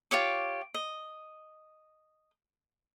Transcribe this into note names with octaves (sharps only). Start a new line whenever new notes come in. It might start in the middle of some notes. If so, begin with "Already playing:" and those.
F4 G4 C#5 D6
D#5